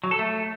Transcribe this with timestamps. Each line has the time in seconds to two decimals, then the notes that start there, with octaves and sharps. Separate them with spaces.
0.04 F#3
0.11 A4
0.19 A3